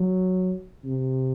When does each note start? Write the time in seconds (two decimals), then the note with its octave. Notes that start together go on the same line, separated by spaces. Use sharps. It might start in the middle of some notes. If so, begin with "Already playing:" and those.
Already playing: F#3
0.85 C3